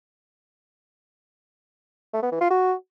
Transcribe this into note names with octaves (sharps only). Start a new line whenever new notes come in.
A3
B3
E3
F4
F#4